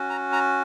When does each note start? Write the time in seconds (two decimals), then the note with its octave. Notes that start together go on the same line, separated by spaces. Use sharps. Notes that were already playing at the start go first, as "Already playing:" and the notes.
Already playing: C#4 F#4
0.10 A#5
0.32 A#5